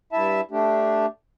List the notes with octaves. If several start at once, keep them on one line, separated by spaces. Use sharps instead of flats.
G2 E4 E5 A5
A3 D4 G4